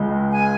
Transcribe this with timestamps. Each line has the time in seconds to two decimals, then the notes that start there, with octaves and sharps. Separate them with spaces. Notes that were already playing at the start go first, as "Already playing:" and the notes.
Already playing: C#2 C#3 G#3
0.31 G#5